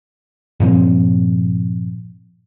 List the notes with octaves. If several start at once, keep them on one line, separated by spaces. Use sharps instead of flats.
G2 A#2 F3 C4